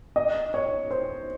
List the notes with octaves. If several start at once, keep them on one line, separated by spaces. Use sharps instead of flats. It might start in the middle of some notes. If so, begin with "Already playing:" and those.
D#5
C#5
C5